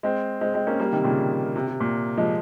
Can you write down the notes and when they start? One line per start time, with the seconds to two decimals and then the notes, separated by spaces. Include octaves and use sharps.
0.03 G#3 C4
0.41 G#3 C4
0.54 G#3 C4
0.67 A#3 C#4
0.80 G3 A#3
0.92 C3 D#3
1.04 A#2 C#3
1.56 C3
1.67 C3
1.80 A#2
2.18 F3 G#3